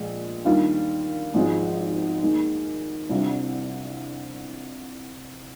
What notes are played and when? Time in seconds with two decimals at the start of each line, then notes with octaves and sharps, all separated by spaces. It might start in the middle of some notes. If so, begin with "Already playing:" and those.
Already playing: A#1 A#2 G#3
0.45 D#2 D#3 G3 D4 F4
1.34 G#1 G#2 F3 G#3
2.22 D#2 D#3 G#3
3.09 C2 C3 G3 D4 F4